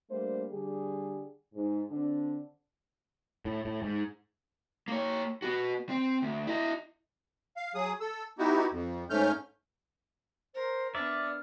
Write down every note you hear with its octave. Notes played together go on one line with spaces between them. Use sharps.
G3 A3 A#3 D4 C5
D3 G3 G4 G#4
G#2
D3 C4 D4
A2
A2
G#2
A#3 C#5
B3 F#4
C4
D2
E4 D#5
F5
F#3 G#4 D#6
A4 E6
B3 D#4 E4 F#4 G4
F2
G#2 A3 C#4 F6 G6
A#4 C5
B3 D4 D5 E5 F6